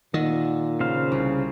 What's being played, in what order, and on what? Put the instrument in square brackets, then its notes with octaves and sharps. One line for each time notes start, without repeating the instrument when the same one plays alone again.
[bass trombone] A#2 [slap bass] D#3 [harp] D#5 F#5 E6
[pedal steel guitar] C#3 C5 F5
[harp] C2